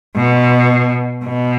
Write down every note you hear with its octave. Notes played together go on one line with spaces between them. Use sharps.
B2
B2